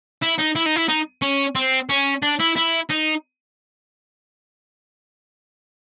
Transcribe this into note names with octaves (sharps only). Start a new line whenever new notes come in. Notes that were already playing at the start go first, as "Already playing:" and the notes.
E4
D#4
E4
D#4
E4
D#4
C#4
C4
C#4
D4
E4
E4
D#4